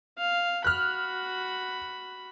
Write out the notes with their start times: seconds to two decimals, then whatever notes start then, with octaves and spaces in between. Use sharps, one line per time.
0.18 F5
0.65 F#4 B5 F6 F#6